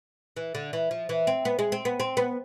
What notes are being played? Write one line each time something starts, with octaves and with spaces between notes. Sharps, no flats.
E3
D3
E3
F3
E3
C4
B3
G#3
C4
B3
C4
B3